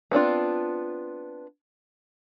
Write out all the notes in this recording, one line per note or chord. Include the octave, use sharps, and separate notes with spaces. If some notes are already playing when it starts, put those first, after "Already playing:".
B3 C4 D4 F4